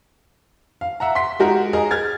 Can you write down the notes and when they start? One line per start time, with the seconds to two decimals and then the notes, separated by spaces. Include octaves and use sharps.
0.81 F5
1.00 E5 F#5 A#5
1.15 C6 B6
1.39 G#3 D#4 F#4 G4 A#4
1.73 G#4 A#4 D#5 A#5
1.91 F6 G#6 A6